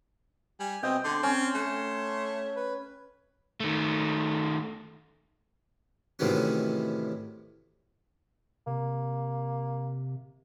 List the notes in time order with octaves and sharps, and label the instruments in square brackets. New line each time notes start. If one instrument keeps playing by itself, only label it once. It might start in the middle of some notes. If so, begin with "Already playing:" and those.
[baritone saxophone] G3 [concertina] G#5
[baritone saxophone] B2 [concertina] C4 D#5 [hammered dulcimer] G5
[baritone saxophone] D3 [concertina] C6
[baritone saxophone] C4 [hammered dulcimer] C#4
[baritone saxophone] A3
[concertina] B4
[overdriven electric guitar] D#3 A3
[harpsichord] A2 C3 D#3 E3 F#3 C#4
[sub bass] C3 [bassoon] A#3